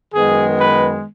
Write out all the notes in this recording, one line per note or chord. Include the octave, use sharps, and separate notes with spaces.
F#2 D#3 G#3 B3 G#4
B4